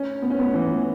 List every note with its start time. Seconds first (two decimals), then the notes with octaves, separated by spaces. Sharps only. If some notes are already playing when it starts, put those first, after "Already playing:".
Already playing: C#4
0.22 B3
0.30 C#4
0.39 B3
0.54 E3